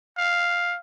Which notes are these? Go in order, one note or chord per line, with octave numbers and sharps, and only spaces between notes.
F5